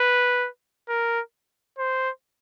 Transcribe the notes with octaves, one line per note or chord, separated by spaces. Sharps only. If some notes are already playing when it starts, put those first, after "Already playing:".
Already playing: B4
A#4
C5